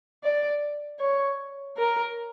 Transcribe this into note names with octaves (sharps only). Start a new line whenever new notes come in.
D5
C#5
A#4